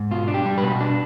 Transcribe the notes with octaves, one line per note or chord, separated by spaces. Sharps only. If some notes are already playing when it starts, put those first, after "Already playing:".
Already playing: G#2
B2 F4
D4
G4
G3
B2 B4
D4